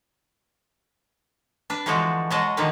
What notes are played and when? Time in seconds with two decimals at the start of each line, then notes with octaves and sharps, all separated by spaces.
1.70 D4 B4
1.86 D3 E3 F3 G#3 E4 F#4
2.31 B2 F#3 G#3 D#5 A5
2.57 B2 D3 D#3 F3 A#3 B4